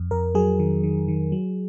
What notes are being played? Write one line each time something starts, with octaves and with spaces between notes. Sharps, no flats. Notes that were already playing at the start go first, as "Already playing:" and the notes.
Already playing: F2
F2 A#4
F#3 G#4
D#3
D#3
D#3
F#3